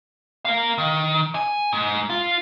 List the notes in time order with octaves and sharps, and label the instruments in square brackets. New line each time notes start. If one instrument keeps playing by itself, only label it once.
[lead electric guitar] A#4 F5
D#3
G#5
G#2
F4